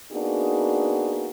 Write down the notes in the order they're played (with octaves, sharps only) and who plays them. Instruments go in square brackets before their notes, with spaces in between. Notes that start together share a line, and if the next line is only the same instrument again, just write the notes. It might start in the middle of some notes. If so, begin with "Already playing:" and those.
[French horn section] A#3 B3 D4 D#4 F#4 G#4